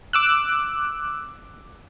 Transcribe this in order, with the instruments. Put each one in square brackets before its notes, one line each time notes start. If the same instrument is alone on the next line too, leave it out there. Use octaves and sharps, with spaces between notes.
[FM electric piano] D6 E6 F#6